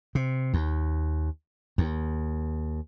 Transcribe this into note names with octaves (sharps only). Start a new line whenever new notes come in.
C3
D#2
D#2